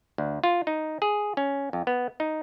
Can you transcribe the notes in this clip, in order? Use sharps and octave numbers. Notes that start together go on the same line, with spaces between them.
D2
F4
D#4
G#4
C#4
F2
B3
D#4